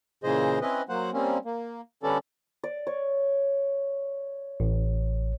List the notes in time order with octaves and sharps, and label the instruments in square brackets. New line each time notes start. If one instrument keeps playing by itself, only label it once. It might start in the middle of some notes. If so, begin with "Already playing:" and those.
[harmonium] A#2 C#3 E3 G#4 C5 D#5
C4 C#4 E4 B4 D#5
F#3 A#3 C5 F#5
G3 A#3 C4 C#4
A#3
D3 G3 B3 C#4 A4 D5
[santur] D5
C#5
[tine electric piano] A1